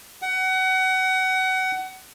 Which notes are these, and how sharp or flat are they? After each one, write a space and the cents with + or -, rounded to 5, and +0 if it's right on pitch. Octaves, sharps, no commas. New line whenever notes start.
F#5 +25